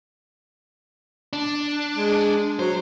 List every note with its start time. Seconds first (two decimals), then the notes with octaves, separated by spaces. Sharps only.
1.33 D4
1.95 G#3
2.59 F#3 C5